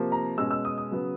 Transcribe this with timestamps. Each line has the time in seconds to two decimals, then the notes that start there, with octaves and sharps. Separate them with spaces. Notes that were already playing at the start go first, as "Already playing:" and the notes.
Already playing: C3 F3 A#3
0.12 A#5
0.38 B2 G#3 C#4 E6
0.51 E6
0.65 D#6
0.78 D#6
0.91 C#3 F#3 B3